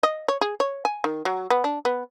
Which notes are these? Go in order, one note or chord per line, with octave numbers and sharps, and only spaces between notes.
D#5
C#5
G#4
C#5
G#5
D#3
F#3
B3
D4
B3